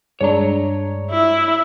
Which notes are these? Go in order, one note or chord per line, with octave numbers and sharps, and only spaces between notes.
G2 G#3 D4 C#5 A#5
E4